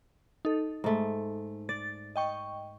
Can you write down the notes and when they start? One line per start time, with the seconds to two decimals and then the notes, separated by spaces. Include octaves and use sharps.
0.45 D#4 A4
0.84 G#2 A3
1.69 D5 A6
2.16 D#5 G5 C#6